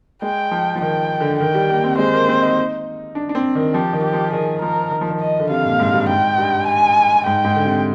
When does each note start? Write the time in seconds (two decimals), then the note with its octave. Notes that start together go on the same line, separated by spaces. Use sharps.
0.22 G#3 G5
0.51 F3
0.76 F3
0.81 D#3 G5
1.20 D3
1.40 D#3 G5
1.54 G3
1.70 A#3
1.84 C4
1.98 G#3 C5
2.13 A#3
2.28 C4
2.42 D#4
3.15 D4
3.29 D4
3.35 C4
3.55 D#3
3.74 F3 G4
3.93 D#3
4.04 G4
4.13 F3
4.33 D#3 G#4
4.62 F3 A#4
4.91 D#3
5.01 F3
5.10 D#3
5.21 D#5
5.40 D3
5.50 C3 F5
5.65 A#2
5.80 G#2
5.93 G2
6.08 G#2 G5
6.38 G2
6.67 G#5
7.25 G#2 G5
7.45 G#2
7.55 D3
7.65 C3